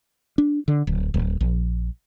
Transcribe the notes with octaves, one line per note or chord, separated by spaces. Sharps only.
D4
D3
D1
D1
A#1